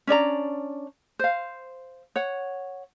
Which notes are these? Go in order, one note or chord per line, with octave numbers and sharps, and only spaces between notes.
C#4 D4 D5 A#5
C5 F5
C#5 F#5